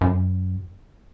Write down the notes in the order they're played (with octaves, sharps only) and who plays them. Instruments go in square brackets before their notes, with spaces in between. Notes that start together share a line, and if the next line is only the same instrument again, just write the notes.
[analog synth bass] F#2